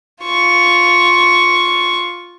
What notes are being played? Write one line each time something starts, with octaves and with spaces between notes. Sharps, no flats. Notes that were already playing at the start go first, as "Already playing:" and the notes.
F4 C#6